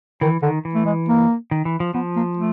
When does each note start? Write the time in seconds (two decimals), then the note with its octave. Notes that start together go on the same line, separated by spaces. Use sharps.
0.21 D#3 E3
0.42 D3 D#3
0.65 E3
0.75 A3
0.86 G#3
1.08 A#3
1.51 D#3
1.65 E3
1.80 F3
1.94 F3 B3
2.16 A#3
2.37 A3